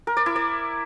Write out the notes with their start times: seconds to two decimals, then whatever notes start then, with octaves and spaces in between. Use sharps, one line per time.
0.07 A#4
0.17 D5
0.26 E4
0.36 D5